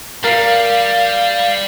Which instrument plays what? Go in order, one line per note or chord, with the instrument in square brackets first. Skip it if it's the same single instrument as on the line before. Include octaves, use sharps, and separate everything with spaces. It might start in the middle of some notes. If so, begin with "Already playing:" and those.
[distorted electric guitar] G3 [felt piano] A#4 C7 [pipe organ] F5